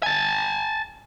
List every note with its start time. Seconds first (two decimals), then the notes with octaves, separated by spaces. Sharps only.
0.03 G#5 A5